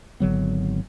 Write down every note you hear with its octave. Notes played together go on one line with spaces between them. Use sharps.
G#1 D3 F#3 B3